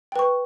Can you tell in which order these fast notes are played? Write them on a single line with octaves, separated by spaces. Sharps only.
G5 B4 C#6